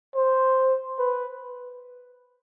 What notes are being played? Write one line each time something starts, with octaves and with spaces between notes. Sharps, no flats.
C5
B4